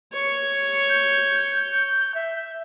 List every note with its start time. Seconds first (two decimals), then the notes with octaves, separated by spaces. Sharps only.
0.13 C#5
0.89 G6
2.14 E5